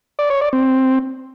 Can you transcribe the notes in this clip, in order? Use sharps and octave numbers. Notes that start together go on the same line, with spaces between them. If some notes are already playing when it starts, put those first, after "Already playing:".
D5
C#5
D5
C4